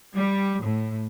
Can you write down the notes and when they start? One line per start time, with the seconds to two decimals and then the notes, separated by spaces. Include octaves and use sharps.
0.14 G3
0.62 A2